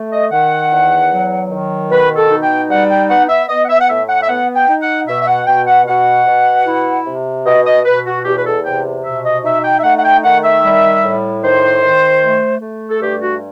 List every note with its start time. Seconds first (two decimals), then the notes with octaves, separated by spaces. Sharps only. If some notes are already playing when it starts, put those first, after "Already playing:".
Already playing: A3
0.12 D#5
0.31 D#3 F#5
0.71 E2
1.11 F#3
1.50 D#3
1.90 B2 B4
2.16 A4
2.30 D#4
2.42 G5
2.69 G3 F#5
2.89 G5
3.09 B3 F#5
3.29 E5
3.48 B3 D#5
3.64 F#5
3.69 E5
3.79 F#5
3.88 A2 E5
4.09 F#5
4.22 E5
4.28 B3 F#5
4.55 G5
4.68 D#4
4.81 F#5
5.07 B2 E5
5.21 E5
5.27 F#5
5.46 B2 G5
5.67 F#5
5.86 B2 F#5
6.26 B2
6.66 E4
7.06 C3
7.45 B2 D#5
7.65 D#5
7.85 B2 B4
8.05 F#4
8.24 E2 G4
8.36 B4
8.45 A4
8.64 C3 G5
9.04 B2 E5
9.24 D#5
9.43 D#4 E5
9.64 G5
9.78 E5
9.83 A3 F#5
9.97 F#5
10.03 G5
10.23 D#3 F#5
10.43 E5
10.63 G3
11.02 A2
11.42 D#3 C5
11.81 D#3
12.21 A3
12.61 A3
12.89 A4
13.01 G2 G4
13.20 F#4